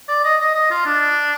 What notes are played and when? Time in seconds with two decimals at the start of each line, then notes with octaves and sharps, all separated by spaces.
0.08 D5
0.24 D#5
0.40 D#5
0.55 D#5
0.71 F4
0.86 D4